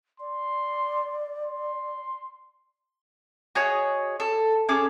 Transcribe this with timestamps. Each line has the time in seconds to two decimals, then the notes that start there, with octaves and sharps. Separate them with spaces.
0.20 D5 C6
1.45 C6
3.55 F#4 G#4 C#5 D#5
4.20 A4
4.69 C#4 G#4 A4 D6